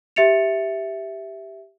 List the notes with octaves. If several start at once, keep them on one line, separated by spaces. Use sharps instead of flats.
G4 E5 A6 C#7 F7